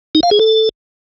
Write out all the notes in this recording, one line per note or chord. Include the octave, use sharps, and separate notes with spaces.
D#4
F5
G#4
A4